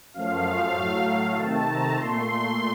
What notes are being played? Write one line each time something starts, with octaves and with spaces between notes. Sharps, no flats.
F#2 F3 A3 F5
A2 F#3 A3
C3 D#3 A3 A5
A#5
A#2 A3 C6
C6